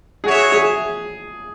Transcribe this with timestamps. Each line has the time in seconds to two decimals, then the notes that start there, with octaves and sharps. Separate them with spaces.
0.23 F#4 G#4 C#5 E5
0.52 G#4